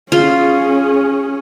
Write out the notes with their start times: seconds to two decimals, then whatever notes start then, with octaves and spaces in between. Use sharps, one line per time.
0.12 C#4 F4 G#4